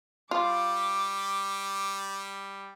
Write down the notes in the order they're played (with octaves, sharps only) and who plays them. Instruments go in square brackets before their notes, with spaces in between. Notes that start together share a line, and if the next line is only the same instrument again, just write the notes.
[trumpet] G3 [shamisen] F4 [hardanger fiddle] D6